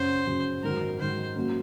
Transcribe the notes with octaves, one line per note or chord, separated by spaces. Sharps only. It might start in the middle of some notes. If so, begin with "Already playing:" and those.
Already playing: F#2 C#3 F#3 C#4 F#4 C5
F#2 C#3 F#3 C#4 F#4
G#2 D#3 F#3 A#4
G#2 D#3 F#3 C5
F#3 A#3 C#4